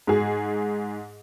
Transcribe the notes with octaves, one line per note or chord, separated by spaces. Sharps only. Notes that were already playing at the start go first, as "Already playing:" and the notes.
G#2 G#4